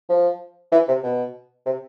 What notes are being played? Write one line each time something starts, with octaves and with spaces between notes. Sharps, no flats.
F3
E3
C3
B2
C3